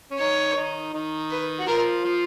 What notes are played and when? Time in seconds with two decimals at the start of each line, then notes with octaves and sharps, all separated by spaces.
0.11 C#4
0.19 D#3 D#4 C#5
0.55 D#3 D#4
0.93 D#3 D#4
1.30 B4
1.59 F#4
1.67 F3 F4 A#4
2.05 F3 F4